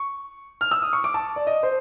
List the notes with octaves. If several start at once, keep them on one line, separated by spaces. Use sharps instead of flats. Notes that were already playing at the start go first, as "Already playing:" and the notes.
Already playing: C#6
F6
E6
D#6
C#6
D6
A5
D5
D#5
C5